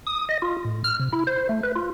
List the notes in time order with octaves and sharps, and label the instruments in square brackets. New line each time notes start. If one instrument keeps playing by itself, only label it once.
[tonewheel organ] D#6
D#5
F4
A2
F6
C3
E4
C5
A3
B4
F4